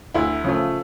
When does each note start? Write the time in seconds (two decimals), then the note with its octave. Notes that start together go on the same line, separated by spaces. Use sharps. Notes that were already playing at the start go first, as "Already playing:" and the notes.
0.14 D2 E4
0.44 C#3 F3 A3